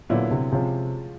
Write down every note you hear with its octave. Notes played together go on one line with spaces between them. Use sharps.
A#2 D3 F#3 B3 E4
C3
C3 F3 G#3 C#4 F4